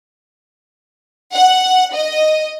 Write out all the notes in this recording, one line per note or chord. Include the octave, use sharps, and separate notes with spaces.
F#5
D#5